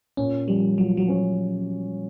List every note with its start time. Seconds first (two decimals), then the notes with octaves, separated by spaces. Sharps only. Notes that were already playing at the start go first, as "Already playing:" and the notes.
0.17 A#2 C#4
0.48 F3 G3
0.77 F3 F#3
0.97 F#3
1.08 C#4